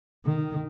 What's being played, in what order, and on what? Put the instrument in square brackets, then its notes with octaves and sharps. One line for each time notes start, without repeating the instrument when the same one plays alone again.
[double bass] D#3